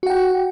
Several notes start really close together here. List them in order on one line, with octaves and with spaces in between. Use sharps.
F#4 F#5 G5